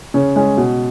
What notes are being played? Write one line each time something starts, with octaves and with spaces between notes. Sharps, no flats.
C#3 C#5
G#3 C#4
B2